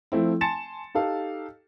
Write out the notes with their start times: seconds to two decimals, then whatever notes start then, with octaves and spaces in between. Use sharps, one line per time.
0.12 F3 A3 C4 E4
0.41 G#5 A5 C6 A6 C#7 E7
0.95 D#4 G4 A4 F5